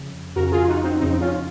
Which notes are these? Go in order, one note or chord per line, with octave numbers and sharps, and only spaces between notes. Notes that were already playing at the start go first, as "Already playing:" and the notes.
Already playing: F2 C#3
F2 C#3 F#4 A#4
F4 G#4
F4
D#4 F#4
C4 D#4
F2 C#3 C4 D#4
C#4 F4